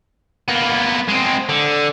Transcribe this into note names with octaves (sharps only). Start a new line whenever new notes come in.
A#3 B3
G#3 C4
D3